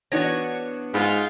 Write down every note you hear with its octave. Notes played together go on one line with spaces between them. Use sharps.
E3 B3 D4 F#4 C#5 A#6
G#2 F4